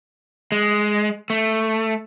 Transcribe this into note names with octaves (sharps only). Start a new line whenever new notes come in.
G#3
A3